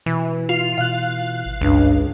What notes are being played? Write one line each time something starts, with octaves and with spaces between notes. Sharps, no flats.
B2 E3
F4
B2 F5 F#6
G#1
C#2 G2